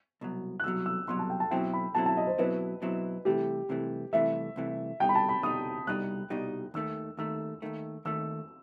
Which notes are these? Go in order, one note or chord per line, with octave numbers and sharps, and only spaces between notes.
C2 B2 F#3
F#6
C2 B2 F#3 E6
E6
C2 B2 F#3 C6
A5
G5
A5
B2 F#3 C4 E4 G5
B5
B2 F#3 C4 E4 A5
A5
D#5
C5
B2 F#3 C4 E4 B4
B2 F#3 C4 E4
C2 C3 E3 A3 G4
C2 C3 E3 A3
C2 C3 E3 A3 E5
C2 C3 E3 A3
C2 B2 G3 D#4 G5
B5
A5
B5
C2 B2 G3 D#4 D#6
C2 B2 G3 D#4 F#6
C2 B2 G3 D#4
D#2 D#3 A3 E6
D#2 D#3 A3 E6
D#2 D#3 A3
D#2 D#3 A3 E6